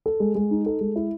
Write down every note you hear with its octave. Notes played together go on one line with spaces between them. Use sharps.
A4
G#3
G#3
D#4
A4
G#3
E4